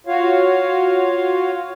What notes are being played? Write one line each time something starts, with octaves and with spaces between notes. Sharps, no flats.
F4 F#4 C#5 F5